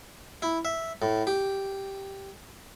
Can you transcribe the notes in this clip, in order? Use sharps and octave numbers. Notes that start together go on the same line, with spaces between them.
E4
E5
A2
G4